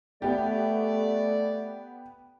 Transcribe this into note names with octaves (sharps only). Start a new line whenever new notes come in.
A3 B3 G4 D5